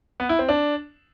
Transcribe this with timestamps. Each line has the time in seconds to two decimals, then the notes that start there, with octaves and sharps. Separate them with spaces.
0.20 B3
0.29 E4
0.39 C4
0.49 D4